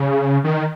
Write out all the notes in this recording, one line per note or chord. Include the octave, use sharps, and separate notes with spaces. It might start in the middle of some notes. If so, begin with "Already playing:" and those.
Already playing: C#3
D#3